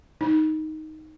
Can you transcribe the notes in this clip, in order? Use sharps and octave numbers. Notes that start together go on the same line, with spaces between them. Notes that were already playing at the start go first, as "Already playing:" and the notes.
D#4